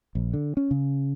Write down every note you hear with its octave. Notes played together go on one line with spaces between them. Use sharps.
A#1
D3
C#4
C#3